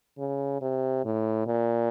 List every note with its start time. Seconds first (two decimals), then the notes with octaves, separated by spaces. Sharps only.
0.18 C#3
0.62 C3
1.05 A2
1.47 A#2